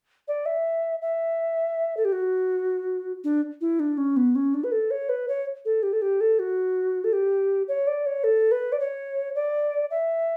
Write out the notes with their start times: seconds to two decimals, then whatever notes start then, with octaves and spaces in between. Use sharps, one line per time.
0.28 D5
0.46 E5
1.02 E5
1.97 A4
2.05 G4
2.12 F#4
3.24 D4
3.61 E4
3.80 D4
3.98 C#4
4.17 B3
4.35 C#4
4.54 D4
4.64 B4
4.72 A4
4.91 C#5
5.09 B4
5.28 C#5
5.65 A4
5.83 G4
5.93 A4
6.02 G4
6.20 A4
6.39 F#4
7.04 A4
7.13 G4
7.68 C#5
7.87 D5
8.06 C#5
8.24 A4
8.51 B4
8.72 D5
8.80 C#5
9.35 D5
9.90 E5